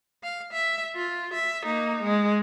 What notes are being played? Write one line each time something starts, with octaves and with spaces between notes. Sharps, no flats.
F5
E5
F4
E5
A#3 D#4
G#3